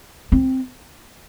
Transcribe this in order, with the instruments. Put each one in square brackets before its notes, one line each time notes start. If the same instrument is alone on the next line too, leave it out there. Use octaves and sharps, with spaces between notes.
[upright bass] C4